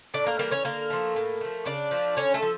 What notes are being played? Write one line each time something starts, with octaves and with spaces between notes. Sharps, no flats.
A2 D4 D5
A#3 A#4
E3 G3 A#3 A#4
C#4 C#5
D3 A#3 A#4
F3 A3
A2
F3 A3
C#3 D4 D5
F3 A3
D3 C#4 C#5
A3 A4
F3